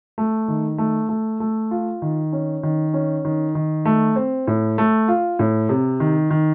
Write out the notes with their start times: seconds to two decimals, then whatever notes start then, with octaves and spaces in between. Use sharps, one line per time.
0.18 A3
0.48 D#3
0.78 A3
1.09 A3
1.40 A3
1.71 F4
2.02 D#3
2.33 C#4
2.63 D#3
2.94 C#4
3.25 D#3
3.55 D#3
3.85 A3
4.16 C4
4.47 A2
4.78 A3
5.08 F4
5.39 A2
5.69 C3
6.00 D#3
6.30 D#3